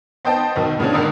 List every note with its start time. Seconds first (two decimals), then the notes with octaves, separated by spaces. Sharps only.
0.25 B3 C5 D#5 G5 A5
0.56 B1 B2 D#3
0.79 A#2 C#3 B3 C#4 D4
0.93 G#1 D3 D#3 A#4 D5 D#6